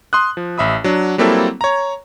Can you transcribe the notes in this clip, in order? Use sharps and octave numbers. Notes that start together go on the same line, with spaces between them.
C6 D#6 F#6
F3
A1 E5 B5 D#6
F#3 D4
F#3 G3 A#3 C4 E4 A4
C#5 A#5